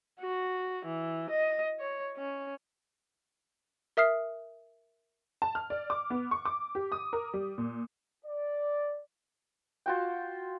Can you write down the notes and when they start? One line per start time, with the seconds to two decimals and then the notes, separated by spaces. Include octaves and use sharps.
0.20 F#4
0.86 E3
1.30 D#5
1.79 C#5
2.17 C#4
3.97 A#4 E5 D#6 F6 C7
5.42 A5
5.55 F6
5.70 D5
5.90 D6
6.10 B3
6.31 C#6
6.45 D6
6.75 G4
6.92 D#6
7.13 A#4
7.34 G3
7.58 A#2
8.26 D5
9.86 F4 F#4 G5